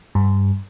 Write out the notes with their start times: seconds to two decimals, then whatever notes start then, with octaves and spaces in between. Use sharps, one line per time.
0.15 G2